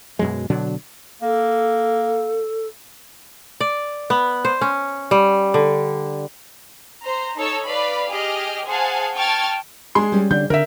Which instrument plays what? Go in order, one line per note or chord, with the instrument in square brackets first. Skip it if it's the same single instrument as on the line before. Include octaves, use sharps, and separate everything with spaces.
[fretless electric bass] F#2 B2 F#3 G#3
B2 D3 F#3 D4
[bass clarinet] A#3 [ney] A4
[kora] D5
B3
C5
C#4
G3
D3
[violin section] C5 A#5
D#4 A4 C#5 A5 E6
B4 D5 F5 B5
G4 G#4 D#5 F6
G#4 C5 F5 F#5 G#5 A5
G5 A5 C#6 F6 G#6 A6
[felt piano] G#3 C6 [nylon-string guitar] D4 G#4
[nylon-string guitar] G3 C#4
[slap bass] D3 [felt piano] G6
[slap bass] D3 [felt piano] A#4 E5